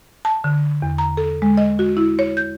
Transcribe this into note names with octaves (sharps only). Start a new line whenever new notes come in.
A5
D3
E2
A#5
A4
G#3
D#5
F#4
E4
C#5
G6